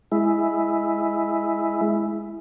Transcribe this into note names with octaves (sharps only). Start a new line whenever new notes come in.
G#3 E4